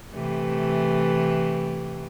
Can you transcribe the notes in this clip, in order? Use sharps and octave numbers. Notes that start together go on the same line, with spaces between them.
C3 E3 A3